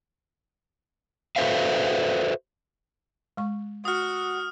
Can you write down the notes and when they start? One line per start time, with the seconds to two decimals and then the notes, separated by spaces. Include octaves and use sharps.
1.36 F#4 A4 B4 C5 E5 F5
3.37 G#3 C#6
3.85 F#4 D#6 F6